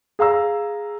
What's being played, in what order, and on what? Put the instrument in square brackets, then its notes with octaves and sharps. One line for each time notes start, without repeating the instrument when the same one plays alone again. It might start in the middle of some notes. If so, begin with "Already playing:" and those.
[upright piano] G#4 F5 A#5 E6